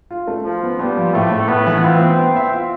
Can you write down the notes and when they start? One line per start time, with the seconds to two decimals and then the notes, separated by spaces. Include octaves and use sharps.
0.11 F4
0.27 A3
0.45 F3 F4
0.63 B3
0.79 G3 B3
0.97 F3
1.14 A2 A3
1.31 A2
1.48 A2 B3
1.67 E3
1.84 C4 F4
2.01 B3
2.18 B3
2.36 E5
2.53 F4